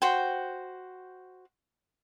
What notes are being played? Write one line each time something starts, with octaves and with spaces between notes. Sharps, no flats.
F#4 C5 G5